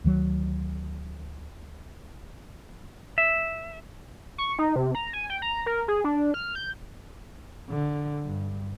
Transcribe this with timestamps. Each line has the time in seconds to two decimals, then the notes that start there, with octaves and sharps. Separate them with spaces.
0.04 D2 D#3 F#3
3.18 E5
4.38 C#6
4.59 D#4
4.76 C3
4.95 A#5
5.13 G#5
5.30 G5
5.42 A#5
5.66 A#4
5.88 G#4
6.04 D4
6.34 F6
6.55 G6
7.69 D3
8.25 G2